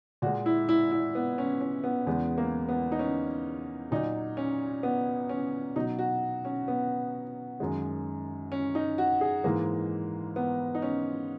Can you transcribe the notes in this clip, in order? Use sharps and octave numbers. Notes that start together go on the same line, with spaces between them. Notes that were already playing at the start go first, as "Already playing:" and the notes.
A#2 G#3 F#4
E4
E4
E4
B3
C#4
C#4
B3
E2 C#3 G#3 B3
A#3
B3
D#4
C#4
A#2 F#3 D#4
C#4
B3
C#4
B2 F#3 D#4
F#4
C#4
B3
F#2 D#3 G#3
C#4
D#4
F#4
G#4
G#2 E3 G#3 A#3
B3
D#4
C#4